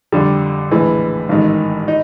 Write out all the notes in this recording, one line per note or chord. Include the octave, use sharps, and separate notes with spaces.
F2 D3 G3
A#1 A2 E3 G#3
A1 G#2 D#3
D#4